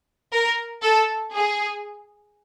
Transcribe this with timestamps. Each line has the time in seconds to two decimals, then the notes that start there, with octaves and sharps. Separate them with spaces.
0.32 A#4
0.82 A4
1.34 G#4